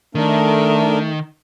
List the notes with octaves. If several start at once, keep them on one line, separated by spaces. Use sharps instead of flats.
D#3 A3 D4 A#4